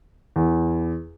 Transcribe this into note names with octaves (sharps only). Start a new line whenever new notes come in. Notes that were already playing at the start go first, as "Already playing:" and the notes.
E2